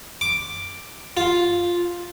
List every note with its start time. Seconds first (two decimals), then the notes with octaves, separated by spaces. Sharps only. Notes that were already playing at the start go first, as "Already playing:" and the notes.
0.21 D6
1.17 F4